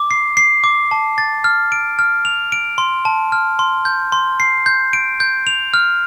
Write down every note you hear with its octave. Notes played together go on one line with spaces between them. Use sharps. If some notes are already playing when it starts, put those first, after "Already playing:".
Already playing: D6
C7
C7
D6
A5
A6
F6
D7
F6
F7
D7
C6
A5
F6
C6
G6
C6
C7
G6
D7
G6
F7
F6